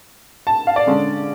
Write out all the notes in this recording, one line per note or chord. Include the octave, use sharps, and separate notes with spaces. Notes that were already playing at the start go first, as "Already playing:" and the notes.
A5
F5
D5
D3 G#3 C#4